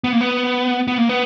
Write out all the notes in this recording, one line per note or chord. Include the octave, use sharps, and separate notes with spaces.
B3
A#3
B3
B3
A#3
B3